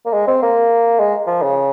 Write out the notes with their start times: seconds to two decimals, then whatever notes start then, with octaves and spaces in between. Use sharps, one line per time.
0.06 A#3
0.13 G#3
0.27 C4
0.42 A#3
0.99 G#3
1.27 F3
1.42 C#3